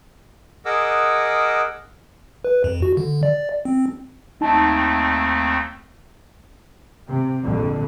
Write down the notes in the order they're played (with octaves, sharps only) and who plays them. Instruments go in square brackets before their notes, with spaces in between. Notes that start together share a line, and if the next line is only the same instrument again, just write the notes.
[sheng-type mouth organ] G#4 A#4 D#5 F#5 D6 E6
[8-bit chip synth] B4
F2
F#4
D3
D5
C4
[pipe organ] D#2 A3 C4 [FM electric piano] D#4 A5
[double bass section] C3
A#1 F2 D3